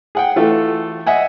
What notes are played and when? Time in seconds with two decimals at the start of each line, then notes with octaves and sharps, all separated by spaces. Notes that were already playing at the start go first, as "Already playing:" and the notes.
0.15 G#4 F#5 G5
0.36 E3 A3 F4 A4
1.07 D#5 E5 F#5 G#5